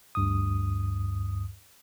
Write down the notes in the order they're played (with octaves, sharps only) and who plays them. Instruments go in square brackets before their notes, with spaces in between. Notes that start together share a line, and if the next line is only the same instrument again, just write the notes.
[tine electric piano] D2 G2 D#6